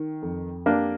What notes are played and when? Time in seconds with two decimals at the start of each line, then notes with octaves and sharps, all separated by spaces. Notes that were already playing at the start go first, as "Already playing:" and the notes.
Already playing: D#3
0.22 F2
0.66 A#3 D4 G4